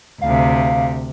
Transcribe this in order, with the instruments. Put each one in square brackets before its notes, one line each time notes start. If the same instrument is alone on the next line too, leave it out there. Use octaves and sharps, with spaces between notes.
[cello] D2 C3 [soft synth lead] F5